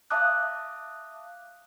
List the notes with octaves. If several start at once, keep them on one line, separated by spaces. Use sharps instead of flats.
E5 F5 A5 D6 D#6 F#6